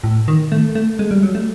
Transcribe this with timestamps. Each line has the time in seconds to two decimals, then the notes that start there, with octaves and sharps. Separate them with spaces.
0.04 A2
0.28 D#3
0.52 A3
0.75 A3
0.99 G#3
1.11 G3
1.23 F#3
1.35 A3